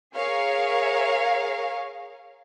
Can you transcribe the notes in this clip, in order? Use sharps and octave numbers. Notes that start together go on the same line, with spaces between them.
G#4 A#4 C#5 F5